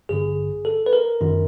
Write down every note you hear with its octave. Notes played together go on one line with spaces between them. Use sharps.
A1 G2 D3 G#4
A4
B4
A#4
G1 F#2 D#3